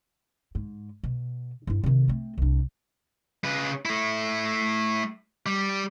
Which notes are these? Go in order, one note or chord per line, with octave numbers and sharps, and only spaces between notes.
G#2
B2
G2 E4
C3 D#3
A3 C4
C2 D4
C#3 B4
A3 E4
G3